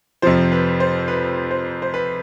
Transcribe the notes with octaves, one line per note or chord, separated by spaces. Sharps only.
F2 C3 F3 C5
B4
C5
B4
C5
C5
B4